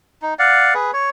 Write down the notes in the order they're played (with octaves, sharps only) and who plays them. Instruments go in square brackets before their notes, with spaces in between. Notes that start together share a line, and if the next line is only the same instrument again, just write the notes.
[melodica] D#4
D5 F5 F#5
G#4 B4
C#5